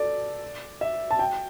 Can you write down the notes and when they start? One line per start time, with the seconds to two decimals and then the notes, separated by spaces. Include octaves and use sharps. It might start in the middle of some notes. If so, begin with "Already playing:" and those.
Already playing: A4 D5
0.81 E5
1.11 A5
1.19 G5